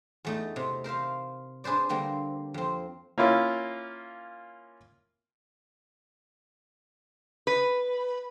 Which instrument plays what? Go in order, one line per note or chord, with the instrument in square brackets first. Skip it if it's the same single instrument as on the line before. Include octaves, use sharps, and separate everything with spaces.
[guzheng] E2 A3 D#4
C3
A#4 C5 E5 F5
D4 G#4 B4 C5 D5
D3 G3 A#3 C4
F2 C4
[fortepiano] A#3 C#4 E4 F4
[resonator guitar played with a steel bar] B4